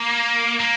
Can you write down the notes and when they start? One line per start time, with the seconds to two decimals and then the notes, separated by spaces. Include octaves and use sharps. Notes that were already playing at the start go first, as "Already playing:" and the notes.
Already playing: A#3
0.59 A#3